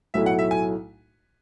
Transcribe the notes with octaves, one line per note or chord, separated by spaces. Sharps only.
B1 A2 F#3 A3 E4 E5
F#5
E5
G#5